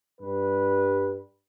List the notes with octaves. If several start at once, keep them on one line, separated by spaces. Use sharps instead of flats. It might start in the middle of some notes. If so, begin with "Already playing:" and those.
G2 G3 B4